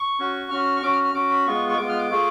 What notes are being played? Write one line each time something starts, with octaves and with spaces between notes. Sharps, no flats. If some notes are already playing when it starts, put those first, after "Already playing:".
Already playing: C#6
C#4 F#4
C#4 F#4 F6
C#6
C#4 F#4 D6
F6
F6
C#4 F#4 D6
B5
G#3 B3 F4 C#6
C#6
G#3 B3 F4 D6
F6
D6
A3 F4 G#4